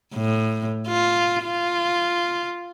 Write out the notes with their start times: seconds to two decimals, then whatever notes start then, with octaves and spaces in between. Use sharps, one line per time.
0.14 A2
0.88 F4
1.44 F4